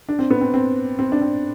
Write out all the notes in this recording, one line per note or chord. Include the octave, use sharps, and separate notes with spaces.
D4
C4
B3
C4
C4
C4
D4
C4